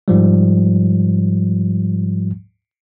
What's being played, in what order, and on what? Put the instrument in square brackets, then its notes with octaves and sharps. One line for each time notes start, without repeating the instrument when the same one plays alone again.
[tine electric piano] G#2 F3 G3